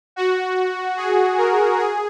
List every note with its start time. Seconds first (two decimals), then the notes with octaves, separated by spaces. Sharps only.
0.16 F#4
0.97 G#4
1.38 A#4
1.79 G#4